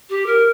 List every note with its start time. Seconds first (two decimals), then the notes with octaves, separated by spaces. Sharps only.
0.09 G4
0.26 A#4